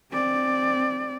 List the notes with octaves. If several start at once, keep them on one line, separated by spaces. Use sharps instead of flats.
C4 D5